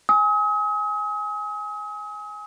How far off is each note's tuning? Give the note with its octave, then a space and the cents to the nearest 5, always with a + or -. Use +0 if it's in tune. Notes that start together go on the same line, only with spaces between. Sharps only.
G#5 +0 D#6 +40